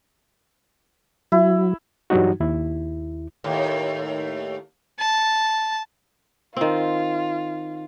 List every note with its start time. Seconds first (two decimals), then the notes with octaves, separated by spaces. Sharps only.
1.32 F#3 E4
2.10 G2 E3 F#3 G3 D#4 F#4
2.40 D#2 E4
3.44 D#2 A2
4.99 A5
6.57 D#3 C4 F4